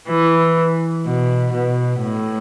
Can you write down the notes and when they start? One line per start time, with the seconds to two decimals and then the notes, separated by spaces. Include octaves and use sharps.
0.09 E3
1.05 B2
1.53 B2
2.02 A2